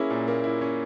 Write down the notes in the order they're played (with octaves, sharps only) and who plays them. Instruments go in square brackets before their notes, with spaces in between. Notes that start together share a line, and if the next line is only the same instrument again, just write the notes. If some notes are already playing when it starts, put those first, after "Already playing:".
Already playing: [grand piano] A#3 C#4 E4 [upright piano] G#4
[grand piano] A#2
A#3
E4
C#4